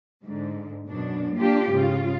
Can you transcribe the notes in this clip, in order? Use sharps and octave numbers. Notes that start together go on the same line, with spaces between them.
G#2 D3
F#2 B2 D4
A#3 D4 F4 G4
G#2 C#3 F4